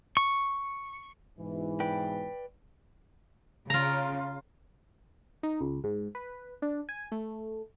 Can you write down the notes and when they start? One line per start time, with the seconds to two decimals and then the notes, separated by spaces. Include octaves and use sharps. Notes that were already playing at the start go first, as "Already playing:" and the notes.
0.17 C#6
1.39 G#2 B2 E3
1.80 B4 D5 G5
3.70 C#3 F4 A#5
5.43 D#4
5.61 C#2
5.84 G#2
6.15 B4
6.62 D4
6.89 G#5
7.12 A3